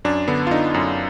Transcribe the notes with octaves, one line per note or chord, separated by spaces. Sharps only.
F#2 D4
D3 B3
F4
D3 D#4
F#2